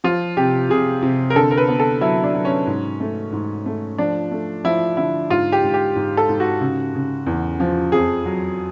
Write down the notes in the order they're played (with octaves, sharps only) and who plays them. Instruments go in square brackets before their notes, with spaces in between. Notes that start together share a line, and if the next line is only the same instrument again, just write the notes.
[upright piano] F3 [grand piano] F4
[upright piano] C3 [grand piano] G4
[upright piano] C3 [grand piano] G#4
[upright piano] C3
[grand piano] A#4
[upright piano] D3 [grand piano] A4
[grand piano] A#4
B4
[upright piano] B3
[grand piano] A4
[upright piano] F#3 [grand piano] E4
[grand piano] D4
[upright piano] F#3
[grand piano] C#4
[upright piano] G#2
A3
G#2
A3
[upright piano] F3 [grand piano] D4
[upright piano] A3
[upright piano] F3 [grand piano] E4
[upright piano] D3 [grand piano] E4
[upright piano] G#2 [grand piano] F4
[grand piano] G4
[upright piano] G#2
[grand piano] G4
[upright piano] G#2
[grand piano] A4
[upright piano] G#2
[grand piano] F#4
[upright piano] C#3
C#3
E2
F3
[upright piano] F2 [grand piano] G#4
[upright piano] F#3